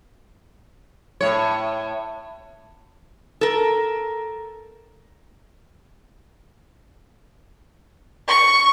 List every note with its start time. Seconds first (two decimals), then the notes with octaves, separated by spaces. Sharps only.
1.21 A2 C#5
3.41 A4 A#4
8.27 C#6